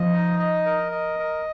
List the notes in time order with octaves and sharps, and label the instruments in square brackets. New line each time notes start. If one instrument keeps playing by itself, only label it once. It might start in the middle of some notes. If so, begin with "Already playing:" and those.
Already playing: [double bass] F3 [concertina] D#5
[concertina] D#4
D#5
A#4
D#5
A#4